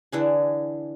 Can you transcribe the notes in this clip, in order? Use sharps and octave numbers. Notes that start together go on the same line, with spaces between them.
D3 E3 G#4